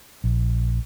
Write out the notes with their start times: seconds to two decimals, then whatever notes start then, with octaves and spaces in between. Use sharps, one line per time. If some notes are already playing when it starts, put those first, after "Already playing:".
0.24 A#1